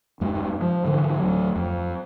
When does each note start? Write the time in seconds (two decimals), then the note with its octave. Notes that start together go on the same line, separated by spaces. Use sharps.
0.20 D#1 F#2 G3 G#3
0.61 F3
0.85 G#2 D3 E3
1.20 D1 F#3
1.55 F2